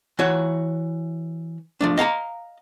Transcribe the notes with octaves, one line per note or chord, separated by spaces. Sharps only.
E3 F#4 C#5
F3 A3 D4
D#5 F5 A5 A#5